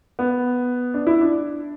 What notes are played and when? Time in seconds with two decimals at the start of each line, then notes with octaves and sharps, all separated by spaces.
0.19 B3
0.94 D4
1.07 E4
1.21 D4